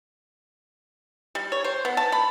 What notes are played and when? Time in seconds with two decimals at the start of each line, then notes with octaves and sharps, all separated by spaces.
1.35 G3
1.52 C#5
1.64 C5
1.85 B3
1.97 A5
2.12 B5